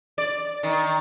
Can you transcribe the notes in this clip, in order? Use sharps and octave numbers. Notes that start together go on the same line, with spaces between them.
D5
D#3